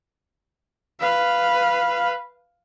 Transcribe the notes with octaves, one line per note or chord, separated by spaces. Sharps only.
B4 F5